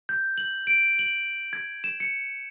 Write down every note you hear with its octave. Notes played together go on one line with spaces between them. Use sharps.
G6
F#7
D7
F#7
G#6
E7
C#7